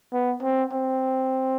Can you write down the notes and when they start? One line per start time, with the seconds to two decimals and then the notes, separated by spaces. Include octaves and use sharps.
0.12 B3
0.42 C4
0.73 C4